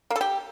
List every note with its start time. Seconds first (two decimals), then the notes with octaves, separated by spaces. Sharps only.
0.10 A#3
0.16 A4
0.21 G4